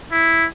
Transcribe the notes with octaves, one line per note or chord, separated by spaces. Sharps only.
E4